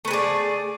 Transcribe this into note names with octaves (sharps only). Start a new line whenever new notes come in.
A3 G#4 B4 D5